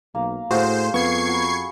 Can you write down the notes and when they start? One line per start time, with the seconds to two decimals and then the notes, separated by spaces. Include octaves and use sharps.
0.15 B1 A#3
0.51 A2 F#4 G#4 C5 F5 C6
0.94 F2 B3 C#6 G#6 C7
1.29 F#4 B5